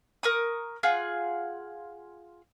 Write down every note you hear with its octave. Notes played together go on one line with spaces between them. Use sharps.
A#4 C#6 D#6
F4 G#4 F#5